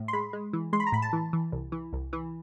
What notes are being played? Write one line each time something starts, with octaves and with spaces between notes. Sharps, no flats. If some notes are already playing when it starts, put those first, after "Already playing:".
Already playing: A2
C6
G#3 B5
G#3
E3
G#3 C6
B5
A#5
A2 B5
A5
E3
E3
C2
E3
C2
E3